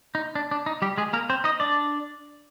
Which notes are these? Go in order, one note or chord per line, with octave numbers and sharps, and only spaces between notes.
D#4
D4
D4
D#4
G3 G4
G#3 G#4
A#3 A#4
C4 C5
D#4 D#5
D4 D5